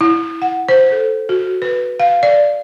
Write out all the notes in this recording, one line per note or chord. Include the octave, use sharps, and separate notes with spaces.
E4
F#5
C5
A4
F#4
B4
F5
D5